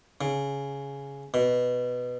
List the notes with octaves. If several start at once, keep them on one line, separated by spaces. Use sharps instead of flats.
C#3
B2